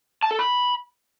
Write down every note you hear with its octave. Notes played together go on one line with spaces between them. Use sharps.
A5
A4
B5